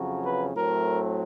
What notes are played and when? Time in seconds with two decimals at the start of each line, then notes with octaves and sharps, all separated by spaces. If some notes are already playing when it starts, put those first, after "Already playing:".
Already playing: F2 C#3 F#3
0.24 B4
0.55 A2 F#3 A3 C4 A#4